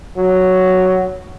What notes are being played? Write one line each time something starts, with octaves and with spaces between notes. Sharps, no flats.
F#3